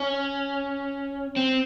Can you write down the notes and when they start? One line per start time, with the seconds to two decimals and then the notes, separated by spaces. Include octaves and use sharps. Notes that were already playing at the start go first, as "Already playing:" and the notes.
Already playing: C#4
1.36 C4